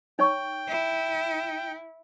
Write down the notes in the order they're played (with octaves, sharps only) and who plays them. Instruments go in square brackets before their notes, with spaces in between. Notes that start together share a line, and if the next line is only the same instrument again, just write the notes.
[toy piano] D#4 C#5 C#6 [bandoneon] G5
[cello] E4